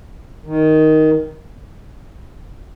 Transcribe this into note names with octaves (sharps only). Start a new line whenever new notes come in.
D#3